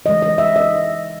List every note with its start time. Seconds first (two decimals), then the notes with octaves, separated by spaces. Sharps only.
0.05 C#3 E3 G#3 D#5
0.22 D#5
0.38 E5
0.56 D#5